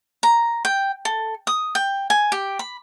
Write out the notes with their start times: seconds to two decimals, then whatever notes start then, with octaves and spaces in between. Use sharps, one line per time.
0.23 A#5
0.65 G5
1.05 A4
1.47 D#6
1.75 G5
2.10 G#5
2.32 G4
2.59 B5